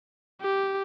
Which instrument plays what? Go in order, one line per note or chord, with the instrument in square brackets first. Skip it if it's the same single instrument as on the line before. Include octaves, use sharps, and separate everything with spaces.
[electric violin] G4